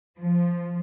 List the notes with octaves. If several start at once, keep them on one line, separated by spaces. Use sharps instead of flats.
F3